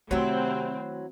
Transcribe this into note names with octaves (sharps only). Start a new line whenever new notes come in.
C3 D#3 F#3 A3 C4 E4